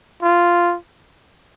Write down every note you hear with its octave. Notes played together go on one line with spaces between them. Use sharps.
F4